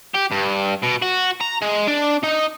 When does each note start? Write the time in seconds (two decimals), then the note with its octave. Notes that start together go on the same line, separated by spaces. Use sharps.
0.15 G4
0.31 G2
0.83 B2
1.02 F#4
1.41 A#5
1.62 G#3
1.88 D4
2.24 D#4